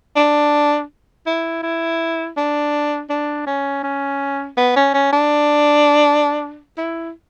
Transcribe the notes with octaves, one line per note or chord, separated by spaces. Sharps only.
D4
E4
E4
D4
D4
C#4
C#4
B3
C#4
C#4
D4
E4